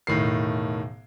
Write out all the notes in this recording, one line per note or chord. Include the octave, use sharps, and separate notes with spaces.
E1 A2 D#3 C7